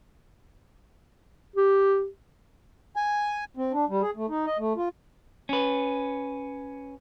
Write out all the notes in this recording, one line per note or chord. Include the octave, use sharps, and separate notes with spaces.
G4
G#5
C4
D4
G3
G#4
A3
D#4
D#5
A3
F4
C#4 B4